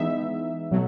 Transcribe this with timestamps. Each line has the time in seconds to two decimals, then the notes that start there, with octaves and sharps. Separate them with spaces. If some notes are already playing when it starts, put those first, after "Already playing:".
Already playing: E3 G#3 B3 D#4 E5
0.71 B2 F#3 A3